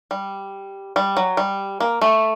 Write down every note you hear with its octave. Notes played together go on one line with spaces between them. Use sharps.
G3
G3
F#3
G3
A#3
A3